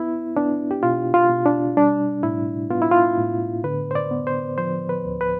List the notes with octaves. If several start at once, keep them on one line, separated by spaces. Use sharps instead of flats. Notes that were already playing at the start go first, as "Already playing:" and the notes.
Already playing: B3 E4
B3 D4
G4
B2 F4
F4
B2
D4
G3 D4
A2 E4
B3 F4
E4
F4
A2
D3 B4
C5
D5
B3
C5
F3 C5
B4
D2
B4